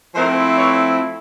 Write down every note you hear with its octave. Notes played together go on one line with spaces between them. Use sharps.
F3 A3 C4 E4 A#4 C5
B4 C#5